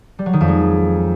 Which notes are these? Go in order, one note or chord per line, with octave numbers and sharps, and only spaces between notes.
G3
F#3
D#3
F2
G#3